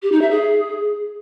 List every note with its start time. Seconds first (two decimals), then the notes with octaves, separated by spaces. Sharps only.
0.02 G4
0.12 D#4
0.21 E5
0.31 G#4